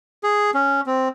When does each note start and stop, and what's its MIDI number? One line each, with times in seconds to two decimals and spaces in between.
0.24 0.51 68
0.55 0.81 61
0.86 1.08 60